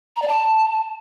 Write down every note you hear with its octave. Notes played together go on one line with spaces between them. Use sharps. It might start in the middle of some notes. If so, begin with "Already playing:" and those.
A#5
D5
A5